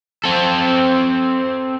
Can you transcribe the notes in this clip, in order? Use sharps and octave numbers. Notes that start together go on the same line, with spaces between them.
C4 A4